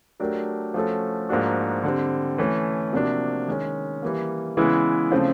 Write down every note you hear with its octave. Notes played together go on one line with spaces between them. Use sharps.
F#3 A3 D4 G4 A#4
F3 A3 C#4 F#4 A4
G#2 F3 A#3 D4 F#4
D3 G3 C4
E3 A3 C#4
C3 F3 A#3 D4 F#4
D#3 G#3 C#4
E3 G3 A#3
C#3 E3 G#3 B3 E4
C#3 F3 A3 C4